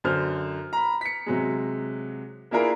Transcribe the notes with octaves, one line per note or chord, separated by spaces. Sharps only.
F#2 D3 C5 F6
A#5 B5
B6 C#7
C3 F#3 G#3
A#3 D4 E4 F4 G#4 A#4